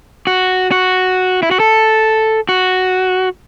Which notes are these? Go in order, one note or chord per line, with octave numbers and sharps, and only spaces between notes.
F#4
F#4
E4
F#4
A4
F#4